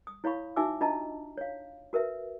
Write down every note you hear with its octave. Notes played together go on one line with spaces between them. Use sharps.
D#6
E4 C#5 F5 B5 C#6
D#4 F#4 E5 G#5 D6 E6
D4 F4 D#5 A5 A#5
C#5 F5
F#4 A#4 B4 E5